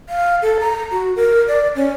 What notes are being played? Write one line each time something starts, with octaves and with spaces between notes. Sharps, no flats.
F5
A4
A#5
F#4
A#4
D5
C#4